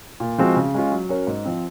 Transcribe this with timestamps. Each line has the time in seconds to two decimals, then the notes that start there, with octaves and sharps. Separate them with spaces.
0.20 A#2
0.38 F3 G#3 C4 F#4
0.56 C#3
0.74 G#3 C#4 F4
0.92 F#3
1.09 C#4 F#4 A#4 C#5
1.27 G#2
1.45 F3 C4